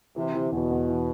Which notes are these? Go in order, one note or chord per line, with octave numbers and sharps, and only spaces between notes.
C3 E3
E3
E2 B2
E2
E3